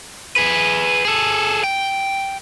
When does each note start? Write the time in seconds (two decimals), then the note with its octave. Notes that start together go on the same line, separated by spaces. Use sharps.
0.36 G#4 B4
1.05 G#4 A4
1.64 G5